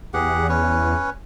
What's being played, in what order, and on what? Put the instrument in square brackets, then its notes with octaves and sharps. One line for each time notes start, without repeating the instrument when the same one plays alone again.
[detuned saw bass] E2 [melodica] G4 G#4 F#5
[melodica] C#4 B4 C#5